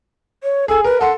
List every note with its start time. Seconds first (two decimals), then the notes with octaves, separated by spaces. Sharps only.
0.43 C#5
0.68 G#4 A4 G#5
0.84 A#4 B4
1.01 A4 F#5 C6